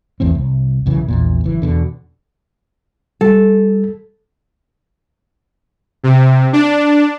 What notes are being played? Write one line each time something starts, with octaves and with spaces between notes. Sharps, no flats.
A1 E2 A2 C4
C2
B1 F#2 C#3 E3
A#1 E2 A#2
F#1 E3
E2 B2 D3
G3 A4
C3
D4